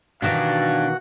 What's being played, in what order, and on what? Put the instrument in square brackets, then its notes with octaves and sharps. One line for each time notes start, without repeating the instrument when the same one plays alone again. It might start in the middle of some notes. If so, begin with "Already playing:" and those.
[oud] B2 D#3 E3 [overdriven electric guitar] D4 G4 [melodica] F#4 F#5 [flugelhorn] F5